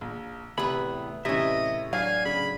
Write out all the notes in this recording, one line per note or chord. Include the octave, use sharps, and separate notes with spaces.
A#1
E2 A2 C3 G#4 B4 B5
A2 C3 E3 C#4 D#5 E5
F#3 D4 F5 G#5
C#3 B5